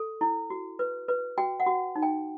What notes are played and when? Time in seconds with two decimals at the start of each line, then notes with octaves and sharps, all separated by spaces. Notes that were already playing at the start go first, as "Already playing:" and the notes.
Already playing: A4
0.21 E4
0.50 F#4
0.79 B4
1.08 B4
1.38 F#4 G5
1.60 F#5
1.66 F#4
1.96 D#4
2.02 G5